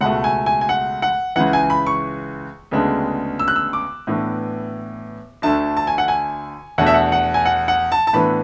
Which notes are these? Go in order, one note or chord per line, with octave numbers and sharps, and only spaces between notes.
C#2 B2 A3 F#5
G#5
G#5
G#5
F#5
F#5
C#2 C#3 E3 F#5
G#5
B5
C#6
D2 C#3 G#3 B3 D4
E6
F#6
E6
D6
A2 E3 B3 D4
D2 D3 A3 D4 A5
A5
G#5
F#5
G#5
E2 B2 A3 D4 F#5
E5
F#5
F#5
G#5
F#5
F#5
A5
A5
A2 E3 B3 D4 B5